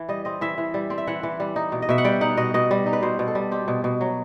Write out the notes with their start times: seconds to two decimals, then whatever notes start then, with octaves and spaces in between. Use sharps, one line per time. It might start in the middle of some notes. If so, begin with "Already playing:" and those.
Already playing: E3 B4
0.09 G3 D#5
0.25 C4 D#5
0.41 E3 E5
0.58 E3
0.74 G3
0.90 C4
0.98 E5
1.07 E3 F#5
1.23 E3
1.40 G3
1.56 D#4
1.72 B2
1.82 D#5
1.89 B2 E5
1.98 F#5
2.04 G3 G5
2.21 D#4 F#5
2.37 B2 D#5
2.54 B2 D#5
2.71 G3
2.86 D#4
2.93 B4
3.02 B2 C5
3.19 B2
3.28 A4
3.35 G3
3.51 C4 G4
3.68 B2
3.84 B2
4.01 F#3